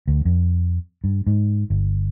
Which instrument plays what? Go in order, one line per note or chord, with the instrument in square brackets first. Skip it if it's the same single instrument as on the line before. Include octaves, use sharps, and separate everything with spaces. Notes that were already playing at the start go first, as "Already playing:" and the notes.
[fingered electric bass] D2
F2
G2
G#2
G1